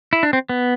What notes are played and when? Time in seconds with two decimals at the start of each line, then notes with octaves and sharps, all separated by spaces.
0.13 E4
0.23 D4
0.33 C4
0.49 B3